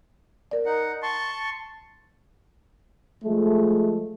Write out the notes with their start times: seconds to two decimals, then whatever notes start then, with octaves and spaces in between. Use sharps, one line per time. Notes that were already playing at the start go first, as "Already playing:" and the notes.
0.51 A#4 D5
0.66 D#4 F#5
1.03 A5 C6 C#6
3.24 F3 G#3 A3